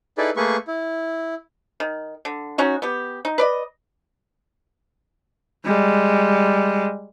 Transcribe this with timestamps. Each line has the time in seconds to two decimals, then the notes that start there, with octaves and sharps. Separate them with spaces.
0.18 D#4 E4 G#4 A4 B4 D5
0.37 A3 A#3 G#4 B4 C#6
0.68 E4
1.80 D#3
2.25 D3
2.58 C#4 D#4 F#4
2.82 B3 G4
3.25 D#4
3.38 B4 D5 D#5
5.65 G3 G#3